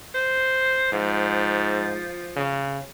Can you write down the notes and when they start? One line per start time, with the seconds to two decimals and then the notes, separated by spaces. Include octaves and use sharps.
0.14 C5
0.93 G#2 F3
2.36 C#3